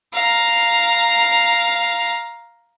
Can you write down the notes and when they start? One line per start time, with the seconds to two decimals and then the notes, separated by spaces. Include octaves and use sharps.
0.14 F5 A#5